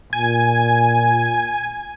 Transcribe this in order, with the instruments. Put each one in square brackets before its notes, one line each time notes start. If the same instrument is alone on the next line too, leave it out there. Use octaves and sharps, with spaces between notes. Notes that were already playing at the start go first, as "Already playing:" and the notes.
[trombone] A#2 [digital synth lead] G#5